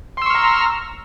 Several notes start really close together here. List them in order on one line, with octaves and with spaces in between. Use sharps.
C6 E6 C#6 F6 A#5